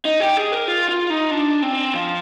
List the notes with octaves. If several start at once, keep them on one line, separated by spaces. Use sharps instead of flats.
D#4
G4
G#4
A#4
F4
F4
D#4
D4
C4
F3